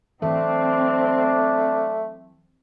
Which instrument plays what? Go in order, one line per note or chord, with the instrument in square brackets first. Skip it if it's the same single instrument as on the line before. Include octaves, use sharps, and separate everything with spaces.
[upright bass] E3 F#3 [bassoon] A3 [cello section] C4 [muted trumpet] D4